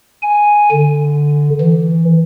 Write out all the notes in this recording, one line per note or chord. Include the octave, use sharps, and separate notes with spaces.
G#5
D3
E3